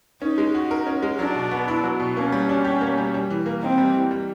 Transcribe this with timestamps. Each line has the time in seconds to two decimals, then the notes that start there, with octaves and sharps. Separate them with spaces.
0.22 C#4 D#4
0.38 G#3
0.55 F#4
0.71 A#4
0.87 C#4
1.02 G#3
1.18 F#3 D4
1.35 B2
1.51 B3
1.68 E4
1.84 F#3
2.00 B2
2.16 A#3 C#4
2.32 G3
2.49 D4
2.65 G4
2.81 A#3
2.98 G3
3.14 G3
3.30 E3
3.46 A#3
3.62 C4 D#4
3.78 G3
3.95 E3
4.11 G3